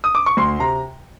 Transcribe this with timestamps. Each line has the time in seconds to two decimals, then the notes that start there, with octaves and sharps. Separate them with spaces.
0.04 D#6
0.15 D6
0.26 C#6
0.37 D2 C6
0.59 C3 A#5